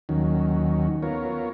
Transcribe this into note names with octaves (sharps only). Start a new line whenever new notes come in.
D#2 D#3 F#3 C#4
B3 F4 A#4 C#5